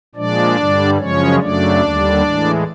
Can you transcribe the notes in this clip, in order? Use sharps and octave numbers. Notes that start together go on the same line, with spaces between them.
A#2 F3 G#3 D4 D5
G2 D3 G3
F#2 C#3 F3 G#3 C#4 C#5
F#2 C#3 F#3 A3 D4 D5
D#2 D3 G3
A2 E3 G#3